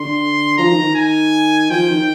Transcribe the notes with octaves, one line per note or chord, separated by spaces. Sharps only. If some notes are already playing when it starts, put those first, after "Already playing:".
Already playing: D3 C6
F3 A#5
D#3
D#3
G#5
F3 G5
D#3